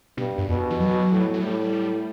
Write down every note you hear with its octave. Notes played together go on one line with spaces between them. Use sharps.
G2 B2
F#2
E2 B2
E3
F#3
A2
F#3
A2 G3